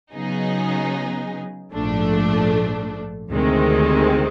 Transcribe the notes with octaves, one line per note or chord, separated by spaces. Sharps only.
C#3 F#3 B3 D#4 G#4
A#1 G#2 F3 A3 D4
D2 C3 D#3 G#3 C4